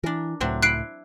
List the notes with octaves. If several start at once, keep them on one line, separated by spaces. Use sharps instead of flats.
E3 D4 A#4
C#2 A2 F#3 C4 D4
E4 B5 F#6 C7 D7